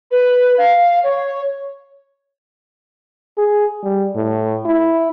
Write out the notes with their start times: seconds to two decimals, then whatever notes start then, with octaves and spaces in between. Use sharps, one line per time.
0.11 B4
0.58 F5
1.03 C#5
3.37 G#4
3.83 G3
4.16 A2
4.65 E4